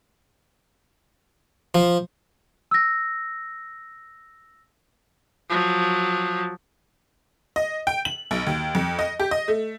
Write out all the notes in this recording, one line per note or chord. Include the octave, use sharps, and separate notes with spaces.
F3
E6 A#6
F3 F#3
D#5
G5
F#7
B1
D#2
F2
D#5
G4
D#5
A3